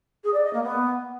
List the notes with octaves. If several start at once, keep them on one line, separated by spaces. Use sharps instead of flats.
G#4
D5
D#5
A#3
B3